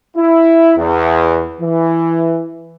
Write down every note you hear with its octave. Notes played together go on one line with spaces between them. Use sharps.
E4
E2
E3